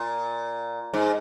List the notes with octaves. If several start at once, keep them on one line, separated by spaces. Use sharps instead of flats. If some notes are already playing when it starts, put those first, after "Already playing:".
Already playing: A#2
G#2